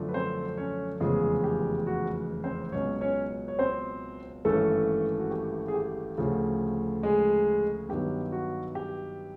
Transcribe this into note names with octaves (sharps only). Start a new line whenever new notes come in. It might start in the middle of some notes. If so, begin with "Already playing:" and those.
Already playing: F#2 D3 F3 A3 D4
B4
C4 C5
C#4 C#5
F1 E2 C#3 F3 G#3 G#4
G4
F#4
C4 C5
C#2 B2 F#3 C#4 C#5
C#4 C#5
C#5
C4 C5
G#1 G2 E3 A3 C#4 A4
F#4
G4
G#4
G4
D2 C#3 F3 A3
G#3 G#4
G2 D#3 F#3 B3 G4
F#4
G4